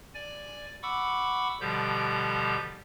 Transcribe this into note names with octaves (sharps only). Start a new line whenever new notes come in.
D5 G#5
F#5 B5 C#6 D6 E6
B2 D3 F3 G3 G4 G6